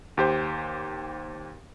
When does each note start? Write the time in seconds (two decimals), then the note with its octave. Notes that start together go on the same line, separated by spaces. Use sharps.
0.17 D#2 G4 C5